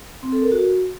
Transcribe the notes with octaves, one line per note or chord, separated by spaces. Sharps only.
C4
A4
A#4
F#4